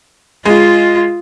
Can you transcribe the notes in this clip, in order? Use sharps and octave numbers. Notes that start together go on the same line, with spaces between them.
G#3 F4